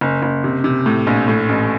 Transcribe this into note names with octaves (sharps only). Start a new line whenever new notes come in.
F#1
F#1
C3
C3
A2
A#1
A2
A1